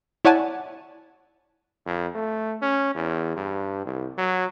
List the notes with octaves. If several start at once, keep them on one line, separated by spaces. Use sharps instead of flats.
E4 C#5 D5 F#5 G#5 A5
F2
A3
C#4
E2
G2
C2
F#3